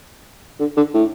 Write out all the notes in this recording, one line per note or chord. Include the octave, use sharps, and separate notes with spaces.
D3
D3
A2